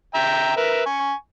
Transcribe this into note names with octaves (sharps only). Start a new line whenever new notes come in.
E5 G5 A#5
A#4 B4 E5
G#5 C#6